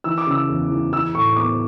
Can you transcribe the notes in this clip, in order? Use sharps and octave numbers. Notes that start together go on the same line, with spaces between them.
E3 E6
D6
C#3 E6
E2
E3
E3 E6
A2 C#6
B3 D6